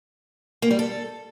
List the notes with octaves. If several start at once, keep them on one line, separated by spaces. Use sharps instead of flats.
A#3
G3
A4